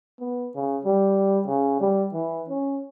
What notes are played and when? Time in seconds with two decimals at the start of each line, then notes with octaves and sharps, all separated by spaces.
0.20 B3
0.55 C#3
0.85 G3
1.47 C#3
1.80 G3
2.13 E3
2.48 C#4